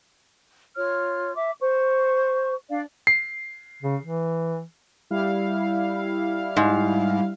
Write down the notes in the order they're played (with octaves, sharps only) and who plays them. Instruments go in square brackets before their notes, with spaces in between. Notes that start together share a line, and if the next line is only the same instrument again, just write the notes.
[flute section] F4 C#5 F6
E5 D6
C5 C#6
D4 D5 F5
[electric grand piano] C7
[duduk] C#3
E3
[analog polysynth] G3 E4 F5
[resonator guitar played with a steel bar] G#2